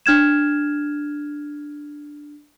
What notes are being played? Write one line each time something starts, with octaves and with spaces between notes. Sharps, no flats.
D4 F6 G#6 E7